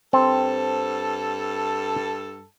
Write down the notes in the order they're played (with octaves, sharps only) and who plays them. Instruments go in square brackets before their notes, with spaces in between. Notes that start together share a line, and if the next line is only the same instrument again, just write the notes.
[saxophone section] G2 A4 [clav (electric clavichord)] C4